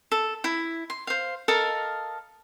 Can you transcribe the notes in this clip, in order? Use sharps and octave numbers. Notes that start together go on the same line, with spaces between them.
A4
E4
C6
C5 F5
A4 A#4 D#5 F5